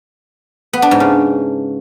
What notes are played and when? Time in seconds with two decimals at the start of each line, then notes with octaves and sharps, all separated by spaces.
0.73 B3
0.82 D4
0.91 G#2
1.00 C#3